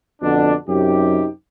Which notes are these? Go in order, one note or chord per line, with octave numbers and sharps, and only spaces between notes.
F2 B2 D3 D4
F#2 C3 D#4 G4